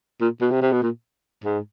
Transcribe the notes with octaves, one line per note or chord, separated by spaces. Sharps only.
A#2
B2
C3
C3
B2
A#2
G#2